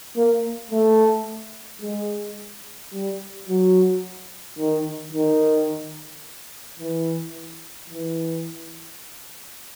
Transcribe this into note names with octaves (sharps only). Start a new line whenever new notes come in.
A#3
A3
G#3
G3
F#3
D#3
D#3
E3
E3